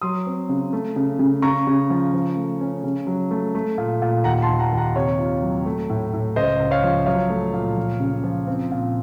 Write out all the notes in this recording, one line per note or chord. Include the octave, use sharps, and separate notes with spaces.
F#3 C6 D#6
C4
C#3
A3
C#3
C#3
C#3 A#5 C#6
C#3
F3
F3
A3
C#4
C#3
F#3
A3
A3
A#2
A#2
D#2 F#5 A#5
A5 C6
D#2
F#5 A#5
D#2
F#5 A#5
C3 C#5
F4
F#3
A3
A2
A2
C#2 C5 D#5
C#2
C#5 F5
F3
F#3 C#5 F5
A3
A#2
F3
C#3
F3
C4
A#2